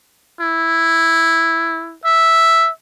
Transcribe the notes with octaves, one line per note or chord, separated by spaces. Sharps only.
E4
E5